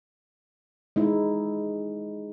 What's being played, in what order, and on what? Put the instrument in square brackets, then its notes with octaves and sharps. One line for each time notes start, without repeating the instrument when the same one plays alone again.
[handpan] G#3 D#4 E4